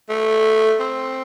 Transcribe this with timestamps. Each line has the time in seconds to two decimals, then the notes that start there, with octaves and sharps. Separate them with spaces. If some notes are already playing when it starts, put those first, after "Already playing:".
0.09 A3
0.80 C4